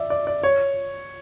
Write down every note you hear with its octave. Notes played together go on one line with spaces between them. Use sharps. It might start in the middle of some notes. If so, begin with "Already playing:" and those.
Already playing: D5 E5
D5
D5
C#5